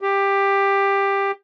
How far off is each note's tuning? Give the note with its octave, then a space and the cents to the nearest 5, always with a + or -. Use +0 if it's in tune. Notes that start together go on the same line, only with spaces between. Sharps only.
G4 +15